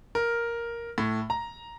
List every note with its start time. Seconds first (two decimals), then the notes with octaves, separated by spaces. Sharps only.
0.15 A#4
0.98 A2
1.30 A#5